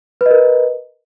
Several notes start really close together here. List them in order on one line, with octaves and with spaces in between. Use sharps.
B4 D#5 A#4